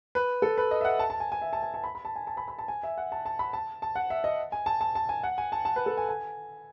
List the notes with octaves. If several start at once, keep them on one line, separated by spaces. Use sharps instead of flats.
B4
A4
B4
D#5
E5
F#5
A5
A5
G#5
G#5
E5
A5
G#5
A5
B5
B5
A5
G#5
A5
B5
B5
A5
G#5
E5
F#5
A5
A5
B5
A5
A5
F#5
E5
D#5
G#5
A5
A5
A5
G#5
F#5
G#5
A5
A5
B4
A4
G#5
G#5